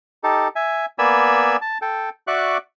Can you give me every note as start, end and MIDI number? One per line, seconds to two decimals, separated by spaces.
0.24 0.48 63
0.24 0.48 67
0.24 0.48 69
0.56 0.86 76
0.56 0.86 80
0.99 1.57 58
0.99 1.57 59
0.99 1.57 74
0.99 1.57 80
0.99 1.57 83
0.99 1.57 88
1.61 1.78 81
1.82 2.10 69
1.82 2.10 79
2.27 2.57 66
2.27 2.57 74
2.27 2.57 76
2.27 2.57 85
2.27 2.57 86
2.27 2.57 90